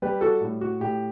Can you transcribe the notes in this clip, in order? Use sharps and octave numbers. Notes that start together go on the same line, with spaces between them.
G3 G4 B4
F#4 A4
A2
F#4
A2 G4